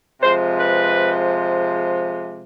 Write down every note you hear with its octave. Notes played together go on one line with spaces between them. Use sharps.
C3 F3 G#3 C5
B4